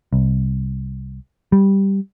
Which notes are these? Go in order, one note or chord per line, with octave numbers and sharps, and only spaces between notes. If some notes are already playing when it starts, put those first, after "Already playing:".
C2
G3